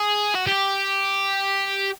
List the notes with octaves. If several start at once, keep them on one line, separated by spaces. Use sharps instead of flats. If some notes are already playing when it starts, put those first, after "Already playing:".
Already playing: G#4
F#4
G4